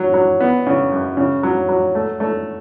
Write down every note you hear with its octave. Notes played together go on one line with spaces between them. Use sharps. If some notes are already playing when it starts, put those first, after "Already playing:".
Already playing: F#3
F#3
B3
C#3
F#2
C#3
F#3
F#3
A3
A3